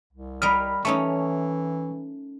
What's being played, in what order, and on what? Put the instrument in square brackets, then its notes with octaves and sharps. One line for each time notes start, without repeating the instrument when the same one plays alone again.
[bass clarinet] C2
[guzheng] G3 A#4 D#5 [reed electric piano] B5 F6
[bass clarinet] E3 [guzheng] A3 C#4 D#4 [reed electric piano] C#6